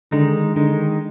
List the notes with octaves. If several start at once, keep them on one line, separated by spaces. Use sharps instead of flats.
D3 D#3 G#3 D#4
D3 D#3 G#3 D#4